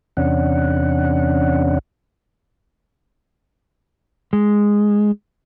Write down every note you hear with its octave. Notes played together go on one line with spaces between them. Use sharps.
E2 C3 C#4 D4 F#5
G#3